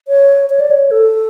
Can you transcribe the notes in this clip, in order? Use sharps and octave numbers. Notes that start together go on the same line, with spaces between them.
C#5
C#5
D5
C#5
A4